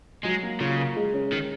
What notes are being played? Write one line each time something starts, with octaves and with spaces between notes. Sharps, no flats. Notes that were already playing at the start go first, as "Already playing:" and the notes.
F#3 G#3
A#3
C#3 F4
A#4
G#3
C#4
D#3 G#4